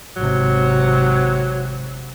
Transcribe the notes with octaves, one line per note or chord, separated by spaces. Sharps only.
G#1 C3 F#3